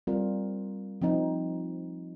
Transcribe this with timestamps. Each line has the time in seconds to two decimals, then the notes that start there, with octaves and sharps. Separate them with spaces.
0.07 G3 C4 F4 A#4
1.02 F3 C4 D#4